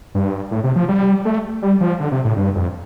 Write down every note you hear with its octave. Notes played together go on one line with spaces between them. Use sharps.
G2
A2
C3
F3
G3
A3
G3
F3
D3
C3
A2
G2
F2